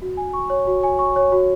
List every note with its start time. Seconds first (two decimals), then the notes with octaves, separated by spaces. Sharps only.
0.02 F#4
0.17 G#5
0.33 C#6
0.50 C#5
0.67 F#4
0.83 G#5
0.99 C#6
1.16 C#5
1.32 F#4